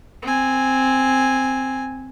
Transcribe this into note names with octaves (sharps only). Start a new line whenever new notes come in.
C4 G#5